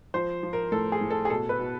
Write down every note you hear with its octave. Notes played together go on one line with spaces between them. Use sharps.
F3 C5
F3
A#4
A2 A4
G#4
A2
A4
G#4
B2 A4
B4
B2